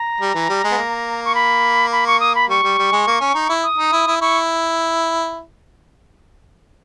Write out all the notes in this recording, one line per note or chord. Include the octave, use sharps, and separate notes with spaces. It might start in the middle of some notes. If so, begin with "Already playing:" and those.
Already playing: A#5
G3
E3
G3
G#3
B3
A#3
C#6
B5
B5
C#6
D#6
B5
G3 C#6
G3
G3
G#3
A#3
C#4
D#4
E4
D#6
D#4
E4
E4
E4 C#6